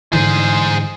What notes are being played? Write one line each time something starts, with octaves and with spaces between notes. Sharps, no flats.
G#2 D3 E3 G#4 C5